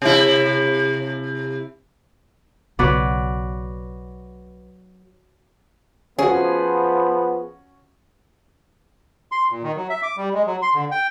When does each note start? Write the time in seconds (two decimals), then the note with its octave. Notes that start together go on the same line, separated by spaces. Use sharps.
0.02 C3 E4
2.79 B1 C#3 F#3 B3 B4 D5
6.18 F3 B3 C#4 F#4 G#4
9.32 C6
9.51 A#2
9.63 D#3
9.76 F#3
9.90 E5
10.03 D6
10.17 G3
10.34 G#3
10.47 F#3
10.62 C6
10.74 D3
10.91 G5